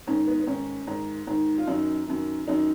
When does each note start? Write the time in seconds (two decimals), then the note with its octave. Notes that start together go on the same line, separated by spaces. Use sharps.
0.07 G#2 D#3 C#4
0.27 B3
0.40 B3
0.47 G#2 D#3 C#4
0.87 G#2 D#3
1.27 G#2 D#3
1.58 F4
1.67 F#2 D#3 D#4
2.07 F#2 D#3
2.47 F#2 D#3 D#4